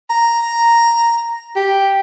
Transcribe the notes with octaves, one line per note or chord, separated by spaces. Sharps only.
A#5
G4